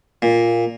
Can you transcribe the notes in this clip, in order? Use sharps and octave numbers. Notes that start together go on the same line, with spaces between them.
A#2